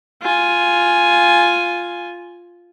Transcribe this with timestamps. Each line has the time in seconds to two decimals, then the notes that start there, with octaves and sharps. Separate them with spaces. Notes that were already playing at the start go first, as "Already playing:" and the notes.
0.22 F4 G#5